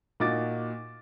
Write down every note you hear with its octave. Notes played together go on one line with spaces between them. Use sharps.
A#2 D#4 F#4 D6 A6